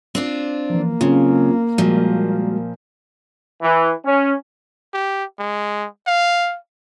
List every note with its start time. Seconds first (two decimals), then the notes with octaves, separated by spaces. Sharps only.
0.15 C4 D4 F4
0.70 E3 F3 A#3
1.01 C#3 F#3 C4 F4
1.78 A#2 F3 G3 G#3 F#4
3.62 E3
4.04 C#4
4.94 G4
5.39 G#3
6.07 F5